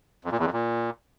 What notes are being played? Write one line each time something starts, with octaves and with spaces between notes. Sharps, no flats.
F2
A#2
E2
F2
A#2